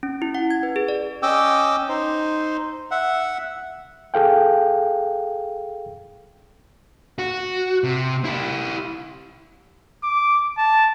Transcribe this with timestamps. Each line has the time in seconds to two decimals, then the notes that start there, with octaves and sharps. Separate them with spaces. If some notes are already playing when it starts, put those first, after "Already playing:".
0.03 C#4
0.22 E4
0.35 F#5
0.51 G#6
0.63 B4
0.76 G#4
0.88 D5
1.23 C#4 D#5 G5 D6 E6
1.89 D#4 C5
2.91 E5 F#5
4.14 G#4 A4 F5 G5
7.19 F#4
7.84 C3
8.25 E4 G4
10.04 D6
10.58 A5